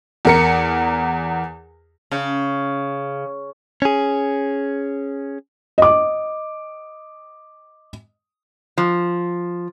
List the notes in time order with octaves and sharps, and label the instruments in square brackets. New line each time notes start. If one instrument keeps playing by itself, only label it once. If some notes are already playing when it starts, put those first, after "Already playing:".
[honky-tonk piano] E2 A#4 C#7
[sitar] C#3
[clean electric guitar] C#4 G#4
[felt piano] D#5 D6
[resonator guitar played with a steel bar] F3